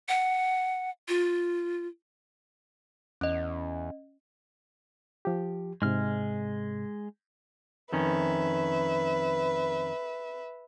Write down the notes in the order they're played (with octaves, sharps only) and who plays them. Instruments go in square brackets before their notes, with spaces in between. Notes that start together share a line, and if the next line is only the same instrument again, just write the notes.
[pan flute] F#5
F4
[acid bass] E2 [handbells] C#4 D#5
[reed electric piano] F3 G4
[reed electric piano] G#2 C3 [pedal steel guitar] G#3 F6
[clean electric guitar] F2 D#3 C#4 [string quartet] B4 E5